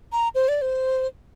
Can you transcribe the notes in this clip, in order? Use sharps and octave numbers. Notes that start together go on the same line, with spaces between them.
A#5
C5
D5
C5